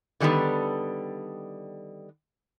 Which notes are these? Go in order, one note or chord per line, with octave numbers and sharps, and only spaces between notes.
D3 D#3 G3 A#3 B3 A4